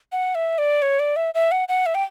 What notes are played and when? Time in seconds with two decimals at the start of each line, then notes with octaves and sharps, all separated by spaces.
0.12 F#5
0.35 E5
0.58 D5
0.82 C#5
1.00 D5
1.16 E5
1.35 E5
1.52 F#5
1.68 F#5
1.86 E5
1.95 G5